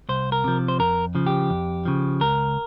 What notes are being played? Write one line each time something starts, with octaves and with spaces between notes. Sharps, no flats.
C2 C5
A#4
C3 F3
C5
F2 A#4
C#3 F3
G4
F2
C#3 F3
C#2 A#4